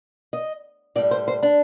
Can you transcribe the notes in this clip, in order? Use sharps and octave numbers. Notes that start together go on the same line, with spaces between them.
D#5
A2 G3 D5
C5
C5
D4